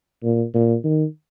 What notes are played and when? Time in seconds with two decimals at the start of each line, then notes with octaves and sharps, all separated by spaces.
0.24 A#2
0.54 A#2
0.84 D#3